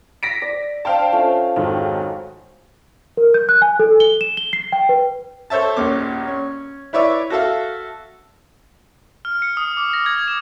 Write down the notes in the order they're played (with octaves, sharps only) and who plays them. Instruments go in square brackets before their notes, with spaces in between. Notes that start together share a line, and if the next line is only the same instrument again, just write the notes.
[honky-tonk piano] A#6 B6 D7
[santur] D5
[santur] D4 C5 C6 [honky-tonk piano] F5 G5 A5
[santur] F3 A3 C#4
[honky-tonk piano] F2 G#2 D#3 [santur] F#3
[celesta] A#4
G6
F#6
G#5
A4
G7
E7
G7
C7
G5
B4
[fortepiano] A4 C5 C#5 E5 A5
A#1 D#2 A#2 C#4 D6
C#4
E4 B4 C#5 D5 E5
F#4 A4 E5 F5
[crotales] F6
C#7
D#6
D6
A#6
G#6
E7